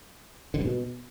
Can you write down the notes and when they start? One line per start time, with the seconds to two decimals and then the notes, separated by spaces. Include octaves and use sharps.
0.54 D3
0.60 G2
0.65 B2